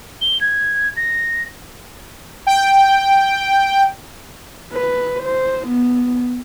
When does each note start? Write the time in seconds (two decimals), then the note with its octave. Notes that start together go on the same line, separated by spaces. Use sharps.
0.21 G7
0.41 G#6
0.97 A#6
2.47 G5
4.73 B4
5.23 C5
5.68 B3